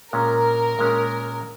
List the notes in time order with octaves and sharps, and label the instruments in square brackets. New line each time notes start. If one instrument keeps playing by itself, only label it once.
[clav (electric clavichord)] A#2 G#3 C#4 [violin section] A#4
[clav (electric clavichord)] A#2 G#3 C#4